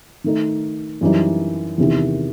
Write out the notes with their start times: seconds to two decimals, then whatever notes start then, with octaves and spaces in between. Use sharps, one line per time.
0.24 D#3 A3 D#4
1.01 F#2 E3 G3 D#4
1.78 E2 C3 D#3